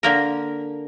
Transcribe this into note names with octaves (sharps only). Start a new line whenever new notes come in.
D3 A#3 A#4